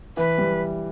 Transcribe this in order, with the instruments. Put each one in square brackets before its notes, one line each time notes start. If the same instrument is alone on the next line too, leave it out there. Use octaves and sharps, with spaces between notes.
[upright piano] E3 [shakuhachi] B4
[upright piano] G3